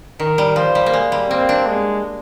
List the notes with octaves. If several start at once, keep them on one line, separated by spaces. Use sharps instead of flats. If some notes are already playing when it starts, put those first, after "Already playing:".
D#3 A#4
G3
F3 C5
G3
A#3
G#3
G3
A#3 C4
D4
G#3